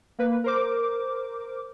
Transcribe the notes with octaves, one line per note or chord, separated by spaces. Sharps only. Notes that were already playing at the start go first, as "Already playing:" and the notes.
A#3 B4
A#4 C5 D6